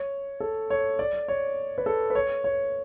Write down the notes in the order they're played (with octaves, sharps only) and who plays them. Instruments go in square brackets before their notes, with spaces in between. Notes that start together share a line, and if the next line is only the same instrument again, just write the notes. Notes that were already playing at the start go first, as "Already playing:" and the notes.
Already playing: [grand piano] C#5
A4
C#5
D5
C#5
B4
A4
B4
C#5
C#5